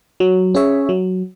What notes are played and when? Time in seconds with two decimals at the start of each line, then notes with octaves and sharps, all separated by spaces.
0.20 F#3
0.55 C#4 G#4 C#5 E5
0.89 F#3